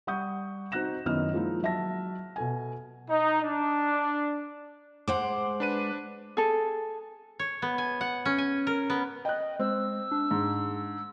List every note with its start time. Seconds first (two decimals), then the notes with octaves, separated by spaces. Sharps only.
0.07 G3 F#5 C#6 D#6 G6
0.72 C4 D#4 F#4 F#6 A#6 E7
1.06 F#2 D#3 B3 E4 D#5 F6
1.34 F3 G#3 A#3 D#4 E4
1.63 F#3 E5 A5 A#6
2.36 B2 A4 G#5
3.10 D#4
3.43 D4
5.08 G#3 C5 F#5 D6
5.60 D4 B4 D#7
6.37 G#4 A4
7.39 C#5
7.62 B3
7.78 G#5
8.01 F#5
8.26 C#4
8.38 G#5
8.67 A#4
8.90 B3
9.25 D#5 G5 F#6
9.60 G#3 C4 E6
10.12 D4
10.31 G#2